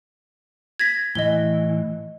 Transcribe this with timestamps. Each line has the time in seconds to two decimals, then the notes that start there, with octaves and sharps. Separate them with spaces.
0.79 G#6 A#6 B6
1.15 A2 E3 D#5 G7